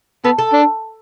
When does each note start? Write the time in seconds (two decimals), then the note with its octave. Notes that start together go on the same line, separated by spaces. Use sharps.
0.24 B3 A4
0.38 A4
0.53 D4